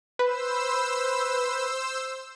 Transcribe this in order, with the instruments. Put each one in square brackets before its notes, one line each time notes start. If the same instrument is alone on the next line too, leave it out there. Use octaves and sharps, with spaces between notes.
[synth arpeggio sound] B4 [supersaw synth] C5 E6